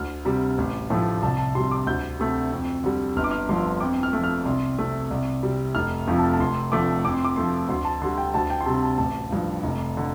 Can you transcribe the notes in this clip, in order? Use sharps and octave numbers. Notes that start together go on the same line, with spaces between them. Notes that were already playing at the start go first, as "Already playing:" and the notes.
Already playing: D2 F6
C3 G3
A1
A2 F3 A3
C2 A5
A5
C3 G3 C6
D6
D2 G6
C3 A3
F2
D3 G3
G1 F6
D6
F6
G2 D3 F3 A3 C6
F2 D6
F6
F3 A3
F6
C2 C6
C3 A3
C2
C3 G3
F1 F6
F2 F3 A3
A5
A5
F1 C6
F2 D3 F3 A3 D6
F2 D6
C6
D6
F3 A3 C6
D2 C6
A5
D3 G3 C6
G5
D2 A5
G5
C6
C3 G3 A5
A5
A1 A5
G2 F3
F1
D3